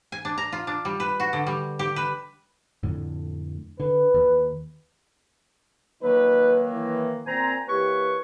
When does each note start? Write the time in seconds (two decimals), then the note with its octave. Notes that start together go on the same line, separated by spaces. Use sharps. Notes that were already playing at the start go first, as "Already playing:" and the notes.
0.12 G#5
0.25 D4
0.38 A#5
0.52 F4
0.67 D4
0.85 G3
1.00 B4
1.20 F#4
1.33 D3
1.47 G3
1.79 G4
1.96 B4
2.83 F2 A2 D3
3.80 D3 B4
4.14 D#2
6.02 D#3 F3 F#3 A#3 D#4 B4
6.70 E3
7.26 A#2 C4 C5 G#5 A#5
7.68 E3 A#3 G4 B4 C#5 C#6